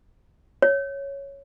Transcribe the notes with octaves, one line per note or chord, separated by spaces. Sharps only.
C#5